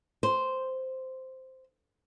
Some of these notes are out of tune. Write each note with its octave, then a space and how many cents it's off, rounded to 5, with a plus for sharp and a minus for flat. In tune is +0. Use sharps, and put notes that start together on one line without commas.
C5 -5